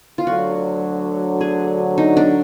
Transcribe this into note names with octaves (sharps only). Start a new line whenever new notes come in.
F4
D2 D3 F#3 F#4
G#4
D#4
D4